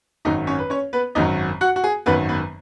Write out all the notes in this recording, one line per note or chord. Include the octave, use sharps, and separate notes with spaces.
G#1 F#2 D#3 F#3 D#4 D#5
C#4 C#5
B4
C#4 C#5
B3 B4
G#1 F#2 D#3 F#3 D#4 D#5
F#4 F#5
F#4
G#4
G#1 F#2 D#3 F#3 B3 B4
B3 B4